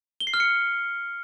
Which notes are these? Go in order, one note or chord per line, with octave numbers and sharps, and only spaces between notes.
G7
C7
F6
C#7